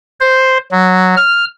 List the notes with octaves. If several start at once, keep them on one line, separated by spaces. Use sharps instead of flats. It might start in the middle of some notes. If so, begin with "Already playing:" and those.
C5
F#3
F6